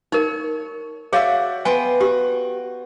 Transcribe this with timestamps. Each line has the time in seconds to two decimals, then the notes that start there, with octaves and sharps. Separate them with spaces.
0.12 D#4 A#4 C#5
1.13 F#4 G#4 C#5 D5 E5 F5
1.65 B3 C5 G5 G#5
2.01 F#4 G4